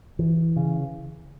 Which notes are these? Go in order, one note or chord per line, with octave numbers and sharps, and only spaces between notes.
E3
C#3